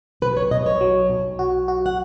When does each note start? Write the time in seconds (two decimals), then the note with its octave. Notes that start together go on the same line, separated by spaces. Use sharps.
0.22 B1 B4
0.37 C#5
0.51 B1 D#5
0.66 C#5
0.81 F#3
1.10 B1
1.39 F#4
1.68 F#4
1.86 F#5